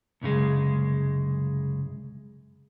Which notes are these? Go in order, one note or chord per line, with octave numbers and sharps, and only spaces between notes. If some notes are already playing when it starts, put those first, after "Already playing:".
C2 F#2 C#3 G#3